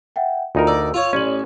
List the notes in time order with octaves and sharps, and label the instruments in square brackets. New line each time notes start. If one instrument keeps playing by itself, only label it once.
[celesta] E5 F#5 G5
[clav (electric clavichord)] D2 D#4 A#4 [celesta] F4 A#5
[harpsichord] D5 [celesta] E6
[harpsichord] F4 C#5
[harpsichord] A1 [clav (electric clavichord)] C#4 G#5 [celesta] D5 F#7